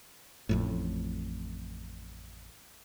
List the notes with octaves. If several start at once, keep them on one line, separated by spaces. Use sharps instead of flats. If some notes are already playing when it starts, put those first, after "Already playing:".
A1 F2 A2